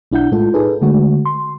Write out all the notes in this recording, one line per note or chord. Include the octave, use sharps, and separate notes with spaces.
B1 D4 E4 F#5 G6
A2 G#3 F4 A4
D#4 G#4 A4 B4
D3 G#3 A3 F#4
C6